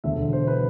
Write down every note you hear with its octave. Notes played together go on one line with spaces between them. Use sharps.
E1 D2 D3 E5
C5
B4